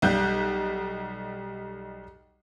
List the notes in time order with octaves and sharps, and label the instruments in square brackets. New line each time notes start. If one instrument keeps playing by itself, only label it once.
[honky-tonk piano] B1 G3 F#6 G6